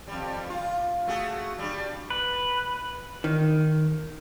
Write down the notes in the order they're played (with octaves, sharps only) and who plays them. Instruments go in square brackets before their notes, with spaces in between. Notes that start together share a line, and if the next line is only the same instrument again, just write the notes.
[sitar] F2 G3
F4
A3 F#4 G#4
G3 D4
[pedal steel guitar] B4
[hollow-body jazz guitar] D#3